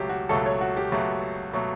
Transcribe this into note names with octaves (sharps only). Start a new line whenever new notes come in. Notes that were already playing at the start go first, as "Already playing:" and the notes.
Already playing: C#2 B2 F#3 A3 G4
F#4
C#2 B2 F#3 A3 A4
C#5
F#4
G4
C#2 B2 F#3 A3
B2 F#3 A3